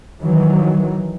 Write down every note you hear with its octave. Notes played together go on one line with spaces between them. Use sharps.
D#3 E3 F#3